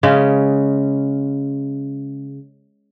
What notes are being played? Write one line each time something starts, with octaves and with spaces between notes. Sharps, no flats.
C#3 G#3 C#4